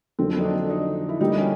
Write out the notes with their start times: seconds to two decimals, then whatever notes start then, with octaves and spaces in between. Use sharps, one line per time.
0.19 F2 D3 F#3 A#3 C4
0.39 D#4
0.44 D4
0.69 D#4
1.09 E4
1.20 D3 G3 A#3 D#4
1.37 C#4